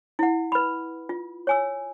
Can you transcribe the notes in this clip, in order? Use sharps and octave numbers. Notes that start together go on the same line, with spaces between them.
E4 F#5
B4 B5
F4
C#5 G#5 E6